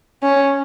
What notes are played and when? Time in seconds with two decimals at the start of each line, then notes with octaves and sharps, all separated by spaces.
0.23 C#4